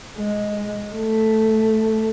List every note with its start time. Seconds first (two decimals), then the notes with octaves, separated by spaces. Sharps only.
0.18 G#3
0.95 A3